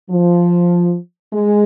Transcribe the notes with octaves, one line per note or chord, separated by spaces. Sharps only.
F3
G#3